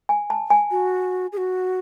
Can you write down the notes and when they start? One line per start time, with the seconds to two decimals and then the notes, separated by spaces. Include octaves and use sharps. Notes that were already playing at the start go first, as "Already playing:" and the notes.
0.09 G#5
0.30 A5
0.50 G#5
0.71 F#4
1.32 G#4
1.37 F#4